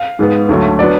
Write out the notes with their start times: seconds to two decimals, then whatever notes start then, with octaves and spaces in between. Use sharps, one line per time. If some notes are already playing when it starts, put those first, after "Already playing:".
Already playing: F5
0.19 G#2 G#3 B3
0.49 D2 D3 F#3 A3
0.79 F#3 B3 D4 D5